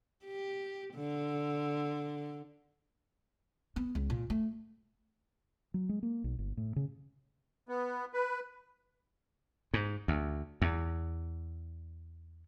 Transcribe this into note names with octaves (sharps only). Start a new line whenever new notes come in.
G4
D3
B3
C#2
A#2
A3
F#3
G#3
A#3
B1
G1
A2
C#3
B3
B4
G#2
D2
E2